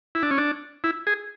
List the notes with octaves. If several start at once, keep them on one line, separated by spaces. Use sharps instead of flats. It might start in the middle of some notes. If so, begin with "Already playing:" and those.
E4
D4
C#4
D4
E4
G#4